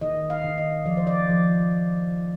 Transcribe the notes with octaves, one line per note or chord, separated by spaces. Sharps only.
D#3 D#5
F5
D#3
D#5
F3 D5
C5
D5
F3